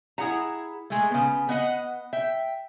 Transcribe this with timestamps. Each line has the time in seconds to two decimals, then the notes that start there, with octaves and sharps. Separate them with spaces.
0.18 E4 G#4 F#5 A#5
0.90 G#3 A3
1.11 C#3 B3
1.49 B3 D#5 F#5
2.13 E5 G5